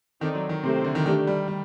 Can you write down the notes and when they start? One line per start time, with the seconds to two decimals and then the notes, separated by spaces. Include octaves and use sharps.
0.21 D#3 C4 D#4 A4 D5
0.35 F#3
0.49 D#3
0.63 C3 A3 C4 G4 C5
0.84 D3
0.95 D#3
1.06 D#3 A3 D4 G4
1.27 G3
1.48 G3